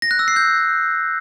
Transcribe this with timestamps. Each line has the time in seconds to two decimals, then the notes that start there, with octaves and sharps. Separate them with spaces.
0.02 A#6
0.11 F#6
0.19 E6
0.28 C7
0.36 G6